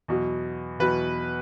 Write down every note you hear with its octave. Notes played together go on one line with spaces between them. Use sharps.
E2 B2 F#3
E2 B2 F#3 B4